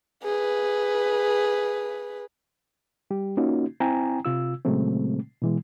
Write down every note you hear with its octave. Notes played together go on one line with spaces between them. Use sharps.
G#4 B4
G3 G4
A#3 C#4 D#4 F4 F#4
C4 E4 G5 G#5 A#5
C3 F4 E6
A#2 C#3 F#3 G#3 A3 C4
B2 E3 G#3